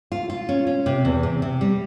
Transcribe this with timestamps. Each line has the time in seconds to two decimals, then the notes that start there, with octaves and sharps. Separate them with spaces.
0.12 F4
0.30 F4
0.49 C#4
0.67 C#4
0.86 C3
1.05 E2
1.23 C3
1.42 C3
1.61 G3